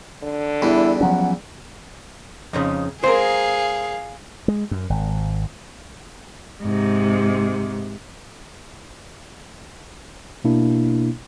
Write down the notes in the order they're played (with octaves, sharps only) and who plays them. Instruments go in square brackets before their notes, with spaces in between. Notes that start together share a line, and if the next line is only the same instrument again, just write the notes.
[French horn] D3
[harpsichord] E2 G3 [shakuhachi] E4
[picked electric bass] F3 F#3 C#4 [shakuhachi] F#5
[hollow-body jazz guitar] F2 C#3 [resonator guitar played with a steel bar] F3 G#3 D#4
[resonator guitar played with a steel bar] G#3 C4 A#4 [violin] G#4 F5 [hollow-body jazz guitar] C5
[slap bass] G#3
F#2
G#1
[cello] G#2 C3
[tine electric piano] B2 A#3 D4 E4